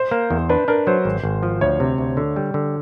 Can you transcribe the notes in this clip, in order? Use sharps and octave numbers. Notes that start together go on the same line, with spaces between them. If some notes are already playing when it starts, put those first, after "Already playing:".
Already playing: C5
A#3
E2
D4 B4
D4 A#4
F#3 C5
G#1
G#1
F3
D2 C#5
C3
D2
D3
G3
D3